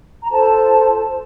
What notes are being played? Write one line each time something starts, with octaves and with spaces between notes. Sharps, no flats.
A#5
F4 A4 C5 A5